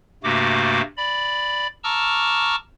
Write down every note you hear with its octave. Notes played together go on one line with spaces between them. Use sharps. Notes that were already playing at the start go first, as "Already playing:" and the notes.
G2 C3 A3 A#3 F#4 D6
D5 B5
A5 A#5 C#6 D6 E6 F6